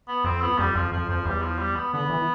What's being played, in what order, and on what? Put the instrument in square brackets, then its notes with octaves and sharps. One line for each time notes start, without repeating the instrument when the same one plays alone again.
[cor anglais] B3
[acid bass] F2 [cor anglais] C4
[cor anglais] B3
[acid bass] F2 [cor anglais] G3
[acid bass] F2 [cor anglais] F3
[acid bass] F2 [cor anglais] F3
[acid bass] F2 [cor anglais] F3
[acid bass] E2 [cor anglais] G3
[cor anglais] F3
G3
B3
[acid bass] D3 [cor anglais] B3
[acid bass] E3